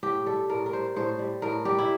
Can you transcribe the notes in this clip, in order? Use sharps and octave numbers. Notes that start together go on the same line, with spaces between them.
A2 G4
G3 A4
A2 A#4
A#4
G3 C5
A2 C5
G3
A2 A#4
G3 G4
E4